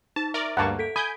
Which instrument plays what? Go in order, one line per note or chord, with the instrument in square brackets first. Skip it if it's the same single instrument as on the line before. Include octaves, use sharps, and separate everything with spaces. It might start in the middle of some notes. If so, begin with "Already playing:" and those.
[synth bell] D#4 [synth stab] A5
[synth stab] A#4 D5 [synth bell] E5
[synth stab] D2 G2 A#3 [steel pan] F#5 A5 C#6
[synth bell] A4 B6 D7
[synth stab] G#5 G6 [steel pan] B5 D#6